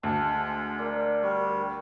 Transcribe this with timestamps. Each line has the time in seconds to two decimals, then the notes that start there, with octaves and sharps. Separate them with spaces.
0.03 D2 A5
0.21 G#3
0.79 D4 A#4
1.23 G3 C#6